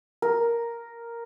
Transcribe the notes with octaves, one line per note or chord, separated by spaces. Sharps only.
A#4